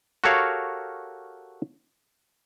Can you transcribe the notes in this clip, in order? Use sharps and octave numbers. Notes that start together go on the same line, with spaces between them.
F#4 G4 A4 A#4 C#5 F5